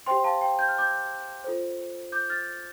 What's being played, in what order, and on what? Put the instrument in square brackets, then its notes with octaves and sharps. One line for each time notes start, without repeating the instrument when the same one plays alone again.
[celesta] G4 C5 G5 C6
F5 A5
G5
G6
F6
D6 G6
F4 A4 C5
D6 G6
F6 A6